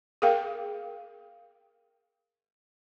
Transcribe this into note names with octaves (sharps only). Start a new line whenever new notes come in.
G#4 A#4 F5 G5